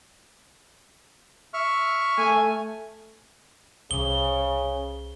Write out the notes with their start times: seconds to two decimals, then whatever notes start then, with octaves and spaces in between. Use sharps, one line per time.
1.54 E5 C#6 F6
2.18 A3 G#5
3.91 C2 C#3 G7